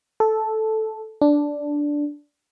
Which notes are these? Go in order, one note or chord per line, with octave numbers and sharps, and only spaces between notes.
A4
D4